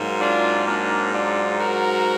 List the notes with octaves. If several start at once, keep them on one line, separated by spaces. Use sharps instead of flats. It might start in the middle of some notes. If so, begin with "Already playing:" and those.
Already playing: G#2 F#3 A#3
D4 F4
A#3 D4
D4 F4
F#4 A#4